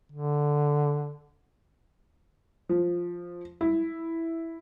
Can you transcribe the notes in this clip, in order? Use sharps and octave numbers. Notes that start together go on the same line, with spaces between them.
D3
F3
E4